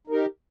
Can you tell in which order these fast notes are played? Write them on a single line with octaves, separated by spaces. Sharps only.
D#4 A#4 G4